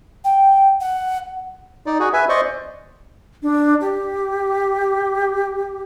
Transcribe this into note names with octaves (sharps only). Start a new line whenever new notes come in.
G5
F#5
D#4 D5
F#4 G#4
B4 E5 G#5
C5 D5 D#5 C#6
D4
G4